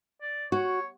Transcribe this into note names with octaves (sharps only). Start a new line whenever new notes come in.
D5
F#4 C#5